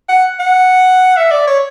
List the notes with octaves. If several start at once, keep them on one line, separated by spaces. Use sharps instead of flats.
F#5
F#5
E5
D5
C#5